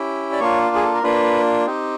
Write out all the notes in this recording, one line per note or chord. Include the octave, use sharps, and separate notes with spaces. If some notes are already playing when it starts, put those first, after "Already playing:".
Already playing: C#4 E4 G4
D5
A#3 D4 F4 C#5
G#4
A4
A#4
A#3 D4 F4 B4
C4 D#4 G4